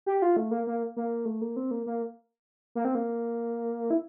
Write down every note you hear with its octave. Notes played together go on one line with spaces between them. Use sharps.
G4
F4
A3
A#3
A#3
A#3
A3
A#3
C4
A#3
A#3
A#3
C4
A#3
E4